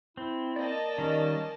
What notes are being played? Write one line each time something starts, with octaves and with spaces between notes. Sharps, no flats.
C4 E4
A#3 D5 D#5 A5
D#3 G3 C#4